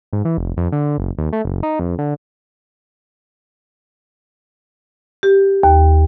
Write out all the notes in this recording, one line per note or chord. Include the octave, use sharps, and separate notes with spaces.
G#2
E3
F1
F2
D3
F#1
D#2
A3
F#1
D#4
F2
D3
G4
D#2